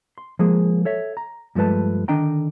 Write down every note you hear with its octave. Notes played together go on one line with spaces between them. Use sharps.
C6
F3 G#3 A#3 G#4
A4 C#5 E5
A#5
G2 F3 G#3 A3 B4 A5
D3 D#3 D4 D#5 G5 A#5